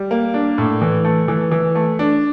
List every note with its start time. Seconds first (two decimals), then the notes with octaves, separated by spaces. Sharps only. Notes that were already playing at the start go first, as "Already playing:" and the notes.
Already playing: G3
0.11 A#3
0.34 D4
0.58 A2
0.82 E3
1.05 A3
1.28 E3
1.52 E3
1.75 A3
1.99 D4